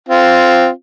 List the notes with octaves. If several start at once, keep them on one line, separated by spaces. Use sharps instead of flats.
C4 F4